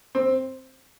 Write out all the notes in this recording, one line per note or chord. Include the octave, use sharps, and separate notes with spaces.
C4